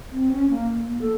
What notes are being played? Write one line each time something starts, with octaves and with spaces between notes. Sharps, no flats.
C4
C#4
A#3
A#3
A4